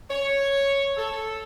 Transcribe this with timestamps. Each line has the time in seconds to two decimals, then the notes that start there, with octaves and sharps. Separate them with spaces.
0.11 C#5
0.97 A4